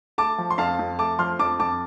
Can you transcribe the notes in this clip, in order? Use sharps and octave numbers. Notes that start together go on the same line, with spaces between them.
A3 A5 D6
F3
C6
F2 F5 A5
F2
A3 A5 D6
F3 C6 F6
F2 A5 D6
F2 A5 D6